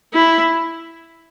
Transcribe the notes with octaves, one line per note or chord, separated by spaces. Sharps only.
E4